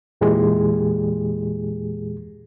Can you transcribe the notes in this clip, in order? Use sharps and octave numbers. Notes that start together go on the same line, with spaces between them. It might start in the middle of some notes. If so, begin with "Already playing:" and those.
E2 A#2 E3 G#3 G4 G#4